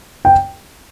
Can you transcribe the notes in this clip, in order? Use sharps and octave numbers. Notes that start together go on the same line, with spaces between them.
G5